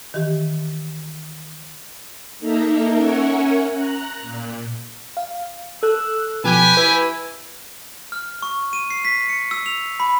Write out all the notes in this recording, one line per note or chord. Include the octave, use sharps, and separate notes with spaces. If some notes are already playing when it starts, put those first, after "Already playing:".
D#3 E3 G4
A#3 D#4 A4 A#4 E5
C#4 A#4 E5 F#5 G#5 C#6
A#5 F#6
A#2
F5
A4 E6 F#6
B2 F3 G4 B4 G#5
E4 B4
F6
C#6
D#7
C7
B6
C#7
E6
F7
B5